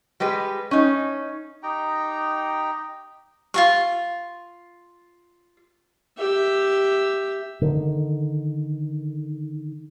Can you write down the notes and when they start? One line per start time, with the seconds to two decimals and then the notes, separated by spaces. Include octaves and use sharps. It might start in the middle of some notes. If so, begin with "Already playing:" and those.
0.20 G3 G#3 G4 B4
0.71 C#4 D#4
1.63 D#4 G4 G5 A#5
3.54 F4 F#4 C#6
6.18 G4 E5
7.61 D3 D#3